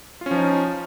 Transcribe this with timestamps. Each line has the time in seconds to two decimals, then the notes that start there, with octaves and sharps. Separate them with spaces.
0.21 F4
0.26 C#4
0.31 F3
0.36 D#4